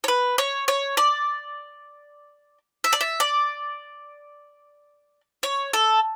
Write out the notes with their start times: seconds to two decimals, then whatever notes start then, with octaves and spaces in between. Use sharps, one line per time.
0.04 C#5
0.08 B4
0.38 C#5
0.68 C#5
0.97 D5
2.84 E5
2.93 D5
3.01 E5
3.20 D5
5.43 C#5
5.73 A4